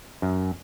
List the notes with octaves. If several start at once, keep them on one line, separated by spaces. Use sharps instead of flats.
F#2